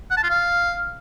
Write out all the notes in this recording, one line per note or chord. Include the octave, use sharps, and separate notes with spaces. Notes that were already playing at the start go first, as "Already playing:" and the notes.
F#5
A5
F4
F5